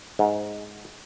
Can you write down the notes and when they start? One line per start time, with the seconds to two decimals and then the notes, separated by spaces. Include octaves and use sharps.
0.19 G#2